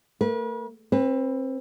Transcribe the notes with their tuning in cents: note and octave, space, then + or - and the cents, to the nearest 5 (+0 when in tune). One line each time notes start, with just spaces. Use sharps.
A3 +45 B4 -40
C4 +25 B4 +0